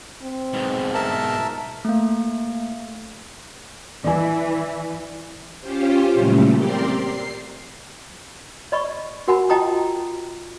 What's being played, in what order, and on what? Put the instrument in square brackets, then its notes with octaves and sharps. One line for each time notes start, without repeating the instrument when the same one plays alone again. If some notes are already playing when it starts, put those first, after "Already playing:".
[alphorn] C4
[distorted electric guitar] G#2 B2
[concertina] A#4 E5 A5
[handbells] A3 A#3
[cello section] E3 [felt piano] D5 G#5
[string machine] C#4 F4 G4 C5
A#2 C#3 E3 F#3 G3 A3
C4 G4 A#4 D5 C6
C7
[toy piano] D5 D#5 B5 C#6
F#4 A#4 F#5 G#5 B5
F4 D#5 G5 A5 A#5 D#6